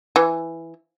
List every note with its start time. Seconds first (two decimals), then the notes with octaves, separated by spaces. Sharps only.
0.16 E3